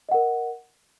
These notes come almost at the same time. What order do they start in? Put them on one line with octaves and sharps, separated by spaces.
D#5 F#5 A#4